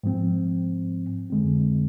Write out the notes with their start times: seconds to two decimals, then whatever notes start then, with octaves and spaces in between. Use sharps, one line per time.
0.03 G#2 F3 C4
1.30 F2 D3 G#3 C4